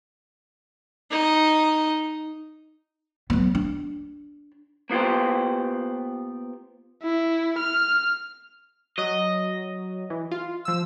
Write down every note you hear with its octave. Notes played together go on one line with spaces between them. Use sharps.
D#4
F#3 B3
D4
A#3 B3 F4 G4 C5
E4
F6
F#3 D#5
E3
F4
F3 E6